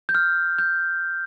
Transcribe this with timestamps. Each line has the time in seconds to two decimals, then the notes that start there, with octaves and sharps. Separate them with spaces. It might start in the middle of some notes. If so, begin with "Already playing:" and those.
0.09 G6
0.15 F6
0.58 G6